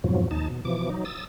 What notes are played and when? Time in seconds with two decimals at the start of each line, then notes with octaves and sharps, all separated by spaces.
0.04 F2 G#2 B2 F3 F#3
0.31 D#2 D#4 A5
0.50 B2
0.65 B2 E3 F3 D6
0.90 F#3 D#4
1.05 D#6 E6 A6